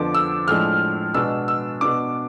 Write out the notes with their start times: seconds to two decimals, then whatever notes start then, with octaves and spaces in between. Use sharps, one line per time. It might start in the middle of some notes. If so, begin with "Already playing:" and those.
Already playing: F2 D3 F3 B3 D4 D6
0.15 E6
0.48 A2 F3 G#3 D4 F6
1.14 B2 G#3 B3 D4 E6
1.48 E6
1.81 B2 B3 D4 D6